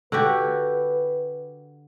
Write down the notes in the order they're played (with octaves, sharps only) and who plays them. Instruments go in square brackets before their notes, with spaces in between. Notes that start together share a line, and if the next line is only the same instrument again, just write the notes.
[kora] D3 F#4 G4 [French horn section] B4